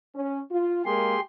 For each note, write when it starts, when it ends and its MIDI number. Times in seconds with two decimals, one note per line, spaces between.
0.15 0.39 61
0.50 0.83 65
0.85 1.14 56
0.85 1.14 58
0.85 1.20 67
0.85 1.20 68
0.85 1.20 84